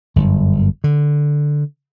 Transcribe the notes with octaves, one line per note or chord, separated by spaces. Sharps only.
G1 F#2
D3